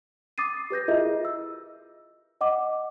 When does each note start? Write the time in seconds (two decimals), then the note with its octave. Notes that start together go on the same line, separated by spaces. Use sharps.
0.38 D6 D#6 A6 C7 D#7
0.70 G4 B4 G6 A#6
0.88 E4 F4 G#4 A#4 D#5 E5
1.25 E6
2.41 D#5 F#5 D6